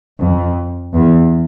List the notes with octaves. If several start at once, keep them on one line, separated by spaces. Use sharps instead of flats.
F2
E2